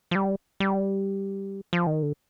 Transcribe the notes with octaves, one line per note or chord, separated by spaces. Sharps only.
F3
G3
G3
F3
D#3
D3